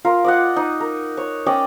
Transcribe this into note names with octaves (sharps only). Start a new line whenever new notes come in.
F4 A#4
D5 D#5 F#5
D#4
A#4
C#5
C#4 D5 D#5 G5